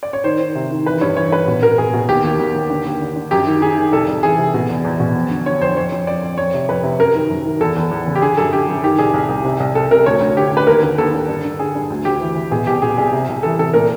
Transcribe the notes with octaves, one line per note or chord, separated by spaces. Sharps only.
D5
C#5
D#3 C5
D#3
C3
D#3
E3 B4
G2 C#5
E3 C#5
G2 B4
B2
B2 A#4
B2 G#4
B2
D#2 G4
D#2
D#2
D#2
D3
D#2
D3
D3
F#2 G4
D#3
D#3 G#4
D#3
C2 A4
C2
E3 G#4
C3
B2
E2
E2
B2
F2
D3
D3 C#5
F2 C5
F2 C#5
F2
F2 D5
F2
F2 C#5
C3
F2 B4
C3
F#2 A#4
D#3
F#2
D#3
E2 A4
E2
E2
C#3
G4
D3 G#4
F#2 A4
D3 G4
F#2
D#3 G4
C2 G#4
C2
C2
C3
C2
C2 A4
C3 A#4
D2 C#5
D2
D3 G4
D2
B4
D#2 A#4
D3
D#2 A4
D3
G2
D3
D3 G#4
G2
D2
D2 G4
E3
E3
B2 G#4
C2 G4
B2 G#4
C2 G#4
C3
C2
E3 A4
C3 A4
A#2 A#4